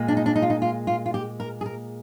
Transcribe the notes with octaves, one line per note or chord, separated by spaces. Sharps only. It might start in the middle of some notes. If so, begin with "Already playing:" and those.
Already playing: A#2 G#3
D4
D#4
D4
D#4
F4
D#4
F4
F4
F4
G4
A#4
G#4
A#4